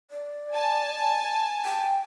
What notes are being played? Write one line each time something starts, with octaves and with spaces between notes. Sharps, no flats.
D5
G#5 A5
G5